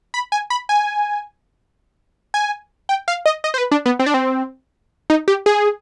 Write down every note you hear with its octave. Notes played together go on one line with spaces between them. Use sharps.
B5
G#5
B5
G#5
G#5
G5
F5
D#5
D#5
C5
B4
D4
B3
C4
D4
C4
D#4
G4
G#4